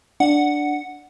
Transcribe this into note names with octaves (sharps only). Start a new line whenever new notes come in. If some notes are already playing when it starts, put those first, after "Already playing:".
D4 F#5